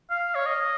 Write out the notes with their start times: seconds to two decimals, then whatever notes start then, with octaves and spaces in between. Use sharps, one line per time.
0.10 F5
0.35 C#5
0.46 D#5